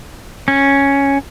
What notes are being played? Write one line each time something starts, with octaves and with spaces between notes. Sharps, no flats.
C#4